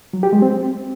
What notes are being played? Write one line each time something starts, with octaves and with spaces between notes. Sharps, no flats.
F#3
G4
G#3
C4